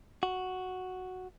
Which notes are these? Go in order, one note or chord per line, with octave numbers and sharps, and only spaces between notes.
F#4